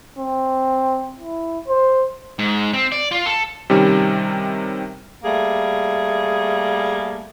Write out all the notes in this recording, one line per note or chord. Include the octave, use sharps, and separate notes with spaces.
C4
E4
C5
G#2
C4
D5
F4
A4
C3 D#3 G3 C#4
G3 A3 A#3 G#4